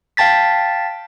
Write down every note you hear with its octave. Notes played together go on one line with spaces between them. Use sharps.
F5 G5 A5 A6 B6